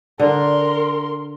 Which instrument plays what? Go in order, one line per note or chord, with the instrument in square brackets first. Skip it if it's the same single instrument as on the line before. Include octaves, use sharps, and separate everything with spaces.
[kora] D3 [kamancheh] A#4 C6